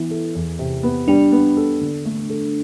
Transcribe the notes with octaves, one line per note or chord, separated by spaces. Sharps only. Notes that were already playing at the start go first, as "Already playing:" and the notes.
Already playing: E3 B3 E4
A4
E2
C3
B3
G3 D4
B3
A4
D3
A3
A4